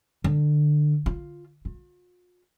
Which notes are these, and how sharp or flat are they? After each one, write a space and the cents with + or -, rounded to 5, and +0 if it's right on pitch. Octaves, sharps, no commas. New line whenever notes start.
D3 +20
F4 +0
F4 +45